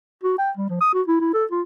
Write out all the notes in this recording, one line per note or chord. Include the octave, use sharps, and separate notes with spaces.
F#4
G5
G3
F3
D#6
F#4
E4
E4
A4
F4